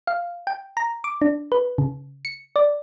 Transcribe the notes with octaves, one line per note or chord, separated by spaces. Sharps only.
F5
G5
A#5
D6
D4
B4
C#3
C#7
D5